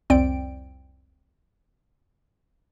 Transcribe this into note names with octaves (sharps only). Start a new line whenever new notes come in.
C2 F2 C4 D5 G5 D7